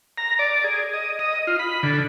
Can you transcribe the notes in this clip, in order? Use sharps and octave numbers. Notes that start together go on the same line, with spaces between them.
A#5
D5
G#4
D#5
D#5
F4
B5
D3